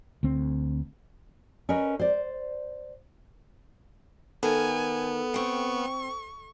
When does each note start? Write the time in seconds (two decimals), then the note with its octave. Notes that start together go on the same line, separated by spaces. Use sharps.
0.23 D2 C4
1.69 C#4 A#4 B4 D#5
1.99 C5 D5
4.43 D#3 B3 A4 A#4 G#5
5.34 C4 G5 C#6